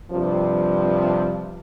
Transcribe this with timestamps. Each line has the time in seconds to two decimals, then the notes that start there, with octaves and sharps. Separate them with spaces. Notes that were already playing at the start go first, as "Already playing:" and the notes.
0.10 G2 C3 F3